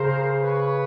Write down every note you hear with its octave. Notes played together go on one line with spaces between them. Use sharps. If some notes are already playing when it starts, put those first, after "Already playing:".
Already playing: C#3 A#4 C5
B4 C#5